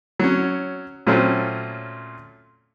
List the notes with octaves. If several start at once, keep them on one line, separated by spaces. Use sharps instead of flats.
F#3 C#4
A#2 F#3 A3 C4 C#4 F4